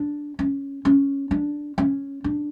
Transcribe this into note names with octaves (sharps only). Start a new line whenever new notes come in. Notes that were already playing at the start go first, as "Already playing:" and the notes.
Already playing: D4
C#4
C#4
D4
C#4
D4